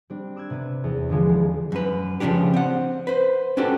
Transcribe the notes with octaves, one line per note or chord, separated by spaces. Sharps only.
G3 C4 D4
D6 E6 F#6 G#6
C3 B3 B4 G#6
E2
D3 E3 F3 G#3
D#1 E2
F#2 B4
C#3 F3 C#4 D4 G4
C4 F#5
B4 C5
C#4 D4 F#4 G4 A4